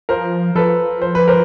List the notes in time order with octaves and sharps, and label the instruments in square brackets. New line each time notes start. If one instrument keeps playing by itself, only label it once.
[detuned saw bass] F3 [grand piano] A#4 C5
[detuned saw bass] F3 [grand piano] A4 B4
[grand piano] C5
B4
A#4 C5